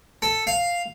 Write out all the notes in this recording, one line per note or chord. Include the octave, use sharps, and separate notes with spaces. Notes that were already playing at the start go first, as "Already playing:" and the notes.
A4
F5